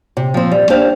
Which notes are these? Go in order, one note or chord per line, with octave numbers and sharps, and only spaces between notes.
C3
F3 C4
G3
D4 G4 C5 F5